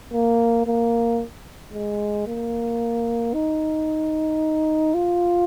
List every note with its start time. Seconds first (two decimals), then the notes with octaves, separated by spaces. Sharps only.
0.13 A#3
0.66 A#3
1.73 G#3
2.27 A#3
3.34 D#4
4.95 F4